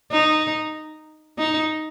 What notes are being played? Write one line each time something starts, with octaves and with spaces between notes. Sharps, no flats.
D#4
D#4